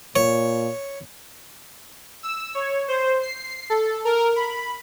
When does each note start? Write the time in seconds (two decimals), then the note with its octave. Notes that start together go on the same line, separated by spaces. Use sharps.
0.16 A#2 C#5
2.23 E6
2.55 C#5
2.88 C5
3.22 C7
3.70 A4
4.05 A#4
4.36 B5